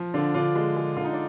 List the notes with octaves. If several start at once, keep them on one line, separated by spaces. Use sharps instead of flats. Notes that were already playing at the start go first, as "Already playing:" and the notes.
Already playing: F3
D3 D4 F4
D3 D4 F4
G#3
G#3
D3 F4
D#4
D4